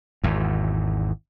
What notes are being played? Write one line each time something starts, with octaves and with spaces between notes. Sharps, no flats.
G#1 E2